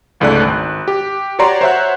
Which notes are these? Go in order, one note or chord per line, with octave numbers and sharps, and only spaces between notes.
G1 C#2 G#2 A3 D5 F#6
G#1
G4
F#4 G4 C#5 D5 A#5 C6
C5 C#5 E5 F#5 F#6